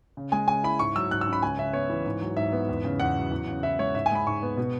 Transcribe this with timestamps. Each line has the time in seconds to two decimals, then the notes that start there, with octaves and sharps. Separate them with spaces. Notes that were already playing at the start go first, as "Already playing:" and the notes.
0.17 C#3
0.32 G#3 G#5
0.47 C#3 G#5
0.64 E4 B5
0.79 G#2 C#6
0.96 F#3 E6
1.10 G#2 F#6
1.21 E6
1.27 C#4
1.33 B5
1.42 C#2 G#5
1.59 C#3 E5
1.73 B3 C#5
1.90 E3
2.05 G#2
2.21 F#3
2.37 G#2 E5
2.52 B3
2.69 E2
2.84 C#3
3.00 E2 F#5
3.16 F#3
3.31 E2
3.48 C#3
3.63 E4 E5
3.78 G#3 C#5
3.95 G#2 E5
4.06 G#5
4.11 G#3 B5
4.26 G#2 C#6
4.42 B3
4.57 B2